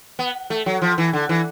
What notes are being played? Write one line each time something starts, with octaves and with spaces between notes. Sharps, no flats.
B3
A3
F#3
F3
E3
D3
E3